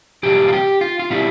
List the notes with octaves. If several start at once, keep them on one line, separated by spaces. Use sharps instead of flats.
E2 B2 G3 G4
F4
G4
F4
F4
B2 G3 E4